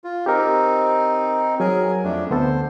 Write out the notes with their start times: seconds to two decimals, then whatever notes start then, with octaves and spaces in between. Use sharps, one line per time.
0.04 F4
0.26 C4 D#4 G4 A#4
1.60 F#3 G#4 A#4 G#5
2.04 F2 A3 D4
2.30 D2 B3 A4 C5